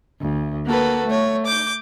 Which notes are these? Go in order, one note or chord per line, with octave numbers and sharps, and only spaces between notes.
D2
A#3 F#4 A4 B4
A3 C#5
D6 G6